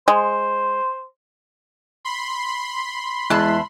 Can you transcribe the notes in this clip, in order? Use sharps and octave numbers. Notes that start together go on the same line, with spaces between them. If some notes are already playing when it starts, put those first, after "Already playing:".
G#3 C5
B5 C6
E2 G#3 E4 A5 F#6